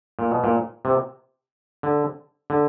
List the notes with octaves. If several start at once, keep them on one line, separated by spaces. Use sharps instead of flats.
A#2
B2
A#2
C3
D3
D3